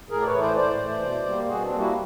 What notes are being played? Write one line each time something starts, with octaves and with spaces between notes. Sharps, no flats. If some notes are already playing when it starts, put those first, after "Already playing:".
A2 G#4 A#4
D5
B4 C#5
E3 A3
C5 D5
A2 C5 D5
E3 A3
B2
G3 A#3
B2 F#4 G#4
C4 D4
G3 A#3
E4 F#4